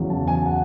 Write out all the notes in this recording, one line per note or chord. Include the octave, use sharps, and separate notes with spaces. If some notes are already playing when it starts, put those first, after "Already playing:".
Already playing: E2 C#3 F#3
A5
G#5
F#5